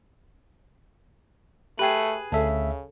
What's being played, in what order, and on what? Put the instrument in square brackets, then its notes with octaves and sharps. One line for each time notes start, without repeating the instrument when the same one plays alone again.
[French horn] A3 [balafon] G4 G5 [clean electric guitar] G#4 B4
[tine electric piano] D2 E5 [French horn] C#3 [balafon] A4 A5